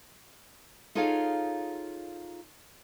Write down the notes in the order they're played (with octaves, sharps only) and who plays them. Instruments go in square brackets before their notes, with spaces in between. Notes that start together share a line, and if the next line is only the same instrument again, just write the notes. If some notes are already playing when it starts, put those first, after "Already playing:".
[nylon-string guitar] D#4 F4 G#4 A4 C#5 F5